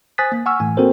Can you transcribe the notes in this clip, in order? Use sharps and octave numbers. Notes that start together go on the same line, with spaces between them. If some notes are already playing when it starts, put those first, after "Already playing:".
C5 G#5 D#6 F#6 A6 B6
A#3
F#5 G#5 C#6 E6 F6
A2 E3 A3 G#5
A#3 C4 F#4 A4 A#4 C5